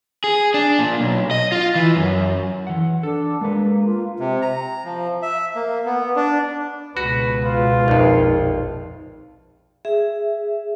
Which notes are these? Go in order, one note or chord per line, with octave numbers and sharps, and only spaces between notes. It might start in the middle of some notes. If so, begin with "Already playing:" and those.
G#4
D4
A#2
B1
D#5
F4
E3
F#2
E3 F#5
D4 A4
G#3 A#3 B4
F4
C3
A#5
F3
E5
A#3
B3
D4
C#2 B2 F#4 B4
F4 B4
A#1 F2 D#4
G#4 E5